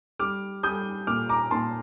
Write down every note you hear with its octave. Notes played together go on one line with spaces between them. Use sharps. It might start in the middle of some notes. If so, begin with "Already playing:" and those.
G3 D6 F6
G3 D#6 G6
A#2 D6 F6
A#5 D6
A#2 A5 C6